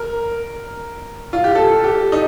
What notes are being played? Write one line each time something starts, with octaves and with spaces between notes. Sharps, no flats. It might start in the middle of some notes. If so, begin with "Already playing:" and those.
Already playing: A#4
F4
G4
A4
G4
D#4